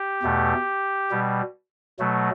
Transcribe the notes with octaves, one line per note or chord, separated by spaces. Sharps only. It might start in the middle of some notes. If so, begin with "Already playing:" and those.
Already playing: G4
E2 B2 A3
B2 G3
B2 F#3 A3